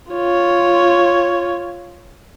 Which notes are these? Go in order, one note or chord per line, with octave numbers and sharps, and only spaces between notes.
F4 C#5